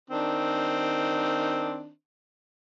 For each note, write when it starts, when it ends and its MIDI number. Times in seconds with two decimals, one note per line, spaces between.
0.10 1.90 51
0.10 1.90 60
0.10 1.90 62